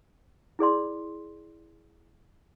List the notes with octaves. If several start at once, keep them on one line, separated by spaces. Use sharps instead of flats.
E4 G#4 D5 C6